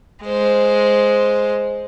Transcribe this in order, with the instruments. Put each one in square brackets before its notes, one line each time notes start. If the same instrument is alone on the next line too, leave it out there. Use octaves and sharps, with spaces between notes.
[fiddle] G#3 C5